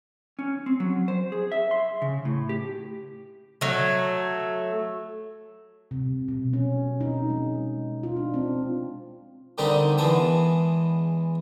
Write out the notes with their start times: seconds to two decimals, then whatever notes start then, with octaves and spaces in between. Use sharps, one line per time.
0.39 C#4
0.66 C4
0.80 F#3
1.08 C5
1.32 G#4
1.52 E5
1.71 C6
2.02 C#3
2.25 A2
2.49 G4
3.61 F#3 A3
5.91 C3
6.28 B2
6.53 C#4
7.01 D#4
7.30 G#3
8.03 F4
8.17 D4
8.34 C4
9.58 D3 D#3 G3 C4 D#4 G4
9.98 E2 G#3 B3 A5